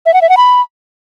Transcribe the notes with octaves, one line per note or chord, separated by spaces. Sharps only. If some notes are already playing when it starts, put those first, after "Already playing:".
E5
F#5
E5
F#5
B5